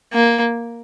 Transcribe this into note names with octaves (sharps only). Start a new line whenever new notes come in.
A#3